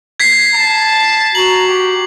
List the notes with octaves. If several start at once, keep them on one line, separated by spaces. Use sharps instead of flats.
G#6 B6 C7
A5 C7
F#4 A#5 F#7
G4